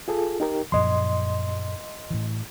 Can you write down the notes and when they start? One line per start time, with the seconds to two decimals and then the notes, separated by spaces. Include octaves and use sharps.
0.08 F4 G#4 A4
0.40 D#4 G4 A#4
0.72 F#2 A#2 F3 D#5 C6
2.10 A2 E3